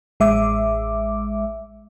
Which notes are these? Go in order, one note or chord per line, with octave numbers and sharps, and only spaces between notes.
A1 G#3 E5 D6